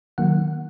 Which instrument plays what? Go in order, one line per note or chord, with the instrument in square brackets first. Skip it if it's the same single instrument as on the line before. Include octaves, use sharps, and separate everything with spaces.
[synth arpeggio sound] D#3 F#3 A#3 F#5